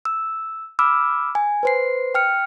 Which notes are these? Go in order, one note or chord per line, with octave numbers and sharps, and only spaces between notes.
E6
B5 D6 E6 F6
G#5
B4 C5 C7
G5 F6 C#7